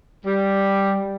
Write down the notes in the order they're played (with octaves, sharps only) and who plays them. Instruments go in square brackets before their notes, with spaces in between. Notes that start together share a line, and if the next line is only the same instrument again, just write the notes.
[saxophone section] G3